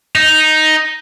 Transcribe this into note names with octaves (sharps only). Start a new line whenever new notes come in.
D#4